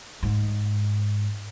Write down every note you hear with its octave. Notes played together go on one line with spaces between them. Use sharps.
G#2